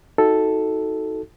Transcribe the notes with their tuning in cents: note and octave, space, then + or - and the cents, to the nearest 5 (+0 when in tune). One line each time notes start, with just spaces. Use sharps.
D#4 +25 F#4 +0 A4 +0